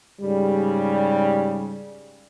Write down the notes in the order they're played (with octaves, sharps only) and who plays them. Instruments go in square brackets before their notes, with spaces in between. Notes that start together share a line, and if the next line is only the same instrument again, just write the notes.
[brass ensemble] G#2 C#3 G3